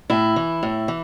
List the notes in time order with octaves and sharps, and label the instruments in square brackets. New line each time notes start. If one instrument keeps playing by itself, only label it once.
[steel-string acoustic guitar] A2 E4
E3
A2
E3